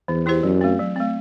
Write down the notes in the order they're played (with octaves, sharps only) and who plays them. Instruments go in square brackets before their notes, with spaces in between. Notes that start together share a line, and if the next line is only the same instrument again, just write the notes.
[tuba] E2 [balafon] E3
[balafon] B3 E4 G4 C5
[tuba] F#2 [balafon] F#3
[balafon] A3 C4
F#3
A3 C4